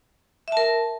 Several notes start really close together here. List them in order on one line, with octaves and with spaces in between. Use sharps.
E5 A5 A#4